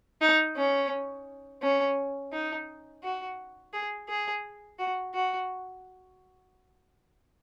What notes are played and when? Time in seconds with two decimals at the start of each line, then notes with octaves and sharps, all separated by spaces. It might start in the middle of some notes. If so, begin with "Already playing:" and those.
0.21 D#4
0.56 C#4
1.62 C#4
2.32 D#4
3.03 F#4
3.73 G#4
4.09 G#4
4.79 F#4
5.14 F#4